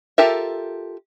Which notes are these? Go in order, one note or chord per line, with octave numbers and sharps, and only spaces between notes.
F4 G4 A4 A#4 E5